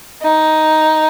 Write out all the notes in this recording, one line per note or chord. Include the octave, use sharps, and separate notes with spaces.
D#4